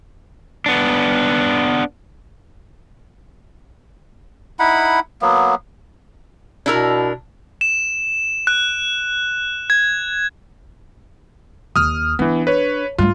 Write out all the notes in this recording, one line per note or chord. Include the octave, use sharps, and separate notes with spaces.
B3 D4
D#4 E4 F#5 B5
F#3 A#3 B3
B2 D4 E4 A#4
E7
F#6
G#6
D#2 D#6 F6
E3 B3 D4
B4 C#5
G2 A3 F4